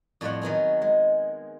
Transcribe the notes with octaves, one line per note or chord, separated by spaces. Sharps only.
F2 A2 G3 C5 F#5
D#3 F#3 B3 G#4
G#3